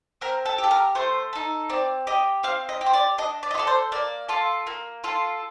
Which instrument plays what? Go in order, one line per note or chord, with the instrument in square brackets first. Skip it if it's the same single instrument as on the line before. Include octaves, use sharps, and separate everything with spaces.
[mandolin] C4 A#4
A4
G4
A4
A#4
A3 C5
D#4 A4
C4 D5
G4 D#5
C4 F5
D#5
G4
C5
D5
D4 D#5
D5
D#5
F4
A4 D5
C5
A#3 D5
F4 A4
A#3
F4 A4